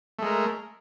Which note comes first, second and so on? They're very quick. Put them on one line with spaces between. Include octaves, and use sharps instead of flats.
A3 G#3 A#4